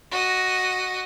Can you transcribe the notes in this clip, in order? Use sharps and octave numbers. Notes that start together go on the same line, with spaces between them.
F#4 D#5